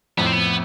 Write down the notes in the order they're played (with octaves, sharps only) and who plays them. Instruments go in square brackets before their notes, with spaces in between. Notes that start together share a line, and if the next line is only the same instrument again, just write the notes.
[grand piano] F2 A2 [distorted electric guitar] B3
[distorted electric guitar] C4
B3